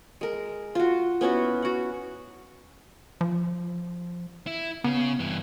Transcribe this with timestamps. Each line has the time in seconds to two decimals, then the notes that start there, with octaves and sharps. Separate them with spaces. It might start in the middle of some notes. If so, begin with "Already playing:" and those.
0.21 G#3 A#4
0.75 F4 F#4
1.21 B3 C#4 E4 F#4
1.62 F#4 F#5
3.21 F3
4.47 E4
4.84 C#3 B3
5.19 G2 E3